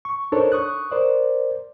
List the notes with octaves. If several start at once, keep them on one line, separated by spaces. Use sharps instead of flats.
C#6
D4 D#4 A4 A#4 C5 C#5
C#6 D#6 F#6
A#4 C5 D5